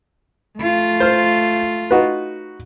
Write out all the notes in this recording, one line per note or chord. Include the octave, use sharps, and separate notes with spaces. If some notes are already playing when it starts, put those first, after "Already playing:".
A3 F4
C5 F6
D#4 F#4 B4